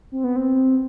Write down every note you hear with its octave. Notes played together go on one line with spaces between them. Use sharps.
C4
B3
C4